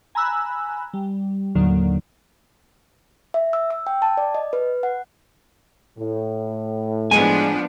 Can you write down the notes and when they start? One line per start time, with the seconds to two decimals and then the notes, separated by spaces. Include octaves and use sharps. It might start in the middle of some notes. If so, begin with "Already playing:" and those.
0.15 G#5 A#5 B5 E6 F#6
0.93 G3
1.55 D#2 A2 D3 F#3 A#3
3.34 E5
3.53 E6
3.70 E6
3.87 G5
4.02 A5
4.17 D5
4.35 D#5
4.53 B4
4.83 F#5
5.98 A2
7.11 F3 G#3 B3 D4 G#5